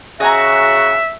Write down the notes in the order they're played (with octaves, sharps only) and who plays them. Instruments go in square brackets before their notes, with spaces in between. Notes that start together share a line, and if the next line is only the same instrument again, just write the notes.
[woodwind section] C#3 F#4 [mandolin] D#5 G#5 A#5 [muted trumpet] E5